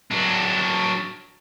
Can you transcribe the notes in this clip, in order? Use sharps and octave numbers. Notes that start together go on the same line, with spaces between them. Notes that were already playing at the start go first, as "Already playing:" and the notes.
F#3 D4